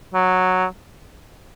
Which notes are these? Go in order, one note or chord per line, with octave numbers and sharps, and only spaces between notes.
F#3